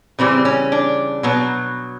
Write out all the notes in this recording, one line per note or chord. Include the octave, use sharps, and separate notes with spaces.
C#3 E3 G3 C4
C#4
D4
B2 F#3 B3